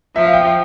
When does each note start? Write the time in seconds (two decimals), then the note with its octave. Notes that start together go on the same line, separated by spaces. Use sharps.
0.16 F3 E5
0.26 F5
0.33 G5